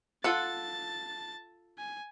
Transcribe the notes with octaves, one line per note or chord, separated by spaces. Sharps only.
F4 A4 F#5 A5 A6
G#5